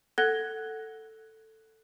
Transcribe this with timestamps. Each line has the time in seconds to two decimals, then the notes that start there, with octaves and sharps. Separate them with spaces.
0.18 A4 F#5 F#6 G#6 A#6 G7